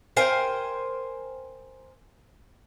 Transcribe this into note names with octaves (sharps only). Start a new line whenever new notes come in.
A#4 C5 G5 G#5